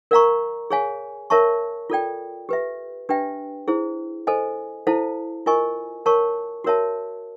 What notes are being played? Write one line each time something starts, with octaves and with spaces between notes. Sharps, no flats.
A#4 D5 F5 A#5 C#6
G#4 C#5 F5 G#5
A#4 C#5 E5 A5 C#6
F4 A4 D5 G5
G4 B4 E5
D4 G4 B4 E5 G5
E4 G#4 C5
A4 C5 D#5 G#5
E4 A4 C5 F5 A5
F4 A#4 D#5 G#5 C#6
A#4 C#5 F5 A5 C#6
F#4 A#4 C#5 E5 A5